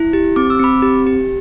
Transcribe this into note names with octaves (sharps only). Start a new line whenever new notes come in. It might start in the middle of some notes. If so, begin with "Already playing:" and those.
Already playing: E4
G4
C4 D6
E6
C4 B5 D6
G4
G4